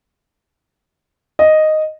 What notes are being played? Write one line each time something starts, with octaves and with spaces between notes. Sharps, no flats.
D#5